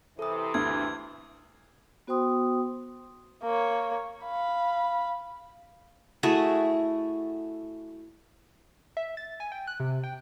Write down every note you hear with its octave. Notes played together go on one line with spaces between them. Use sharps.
C3 E3 A4 D#6
D2 G#6
B3 F#4 C5 G5 C6 D#6
A#3 C#5
F5 B5
A3 E4 F#4 G#4
E5
A6
G#5
G5
F#6
C3
G5